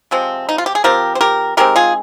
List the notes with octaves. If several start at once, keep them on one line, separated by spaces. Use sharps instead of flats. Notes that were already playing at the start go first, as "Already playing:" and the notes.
C3 F3 G#3 C4
D#4
F4
G4
G#4
F3 C4 G4 A#4
C5
G4 A#4
D#3 G#3 C4 G4 A#4
F4 G#4